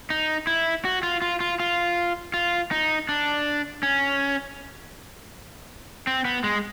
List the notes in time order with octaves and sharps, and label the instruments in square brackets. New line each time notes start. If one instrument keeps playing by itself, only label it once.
[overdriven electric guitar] D#4
E4
F#4
F4
F4
F4
F4
F4
D#4
D4
C#4
C4
B3
G#3